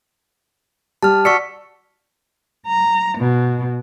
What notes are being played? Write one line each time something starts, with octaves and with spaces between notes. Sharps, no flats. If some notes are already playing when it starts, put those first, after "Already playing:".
G3 A5 F6
F#4 D5 C#6 E6 B6 C#7
A#5
B2